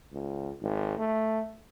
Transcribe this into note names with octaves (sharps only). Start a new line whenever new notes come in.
C#2
G#1
A3